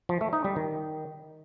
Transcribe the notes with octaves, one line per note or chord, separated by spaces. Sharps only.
F3
A3
D#4
G3
D#3